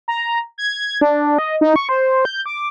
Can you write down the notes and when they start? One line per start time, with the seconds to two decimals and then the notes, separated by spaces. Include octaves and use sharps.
0.08 A#5
0.58 G#6
1.01 D4
1.38 D#5
1.61 D#4
1.76 C#6
1.89 C5
2.25 G6
2.46 D6